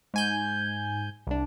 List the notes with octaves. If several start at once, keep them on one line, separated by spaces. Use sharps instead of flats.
G#2 G#5 G6
C2 D4